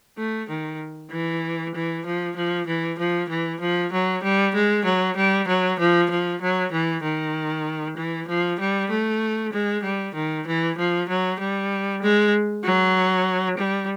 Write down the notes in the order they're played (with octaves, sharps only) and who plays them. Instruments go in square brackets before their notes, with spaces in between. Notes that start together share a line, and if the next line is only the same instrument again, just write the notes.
[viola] A3
D#3
E3
E3
F3
F3
E3
F3
E3
F3
F#3
G3
G#3
F#3
G3
F#3
F3
F3
F#3
E3
D#3
E3
F3
G3
A3
G#3
G3
D#3
E3
F3
F#3
G3
G#3
F#3
G3